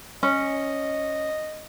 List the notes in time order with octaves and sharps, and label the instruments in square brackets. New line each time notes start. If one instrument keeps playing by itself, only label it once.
[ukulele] C#4 [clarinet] D#5